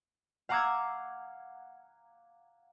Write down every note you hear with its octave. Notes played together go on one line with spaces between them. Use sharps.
F5 F#5 A#5 D6 E6 G#6